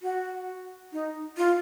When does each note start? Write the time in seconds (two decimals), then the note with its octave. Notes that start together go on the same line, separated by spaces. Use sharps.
0.02 F#4
0.93 D#4
1.37 F4